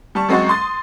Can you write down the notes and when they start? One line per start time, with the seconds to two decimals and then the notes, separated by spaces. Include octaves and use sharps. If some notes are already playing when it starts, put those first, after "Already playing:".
0.15 G3 A5 C#6
0.29 F#2 G#3 C4 F#4 C#6 A6
0.49 C6 D#6 A6